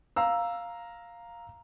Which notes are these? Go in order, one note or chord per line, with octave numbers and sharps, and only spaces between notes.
F5 A#5 E6